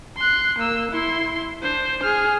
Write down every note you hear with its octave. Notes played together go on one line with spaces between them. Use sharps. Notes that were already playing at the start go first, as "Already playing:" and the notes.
C6 F#6
A#3 E6
E4 C6
D4 C5
G#4 F6